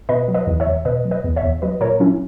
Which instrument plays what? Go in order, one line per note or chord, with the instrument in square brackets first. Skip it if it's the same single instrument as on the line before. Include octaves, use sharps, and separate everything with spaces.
[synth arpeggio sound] B2 B4 D#5
F#3
B4 D#5
E2
C#5 E5
E2
B2 B4 D#5
F#3
B4 D#5
E2
C#5 E5
E2
F#3 B4 D#5
A#2 A#4 C#5
F#3 C#4 E4